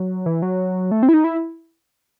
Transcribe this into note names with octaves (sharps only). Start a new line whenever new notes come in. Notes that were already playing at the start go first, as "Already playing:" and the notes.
Already playing: F#3
E3
F#3
A3
C4
E4
D#4
E4